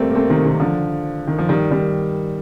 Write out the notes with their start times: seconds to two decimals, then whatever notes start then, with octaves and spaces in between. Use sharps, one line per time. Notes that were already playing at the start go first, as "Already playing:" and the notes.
Already playing: G3 A3 A#3 C4
0.10 A#3
0.15 A3 C4
0.30 C3 D#3
0.45 C3 D#3
0.60 D3 F3
1.27 D#3
1.38 F3
1.49 D#3 G3
1.71 D#3 G3